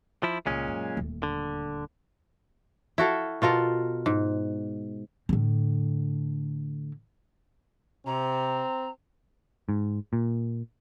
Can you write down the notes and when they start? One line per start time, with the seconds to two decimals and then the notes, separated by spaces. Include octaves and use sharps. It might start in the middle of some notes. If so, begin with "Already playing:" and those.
0.23 F3 E4
0.46 C#2 A#2 G#3 C#4
0.68 F#2
0.97 D#1 D2
1.23 D3
2.98 E4 F#4 A4 F5
3.42 B2 F4 A4 A#4
4.06 G#2
5.29 A2 D3
8.06 C3 C4 A#5
9.69 G#2
10.13 A#2